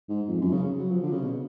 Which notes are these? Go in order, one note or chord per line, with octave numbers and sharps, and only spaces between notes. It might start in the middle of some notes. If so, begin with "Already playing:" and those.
G#2
F2
F#2
C#3
F#3
F3
D3
C#3
B2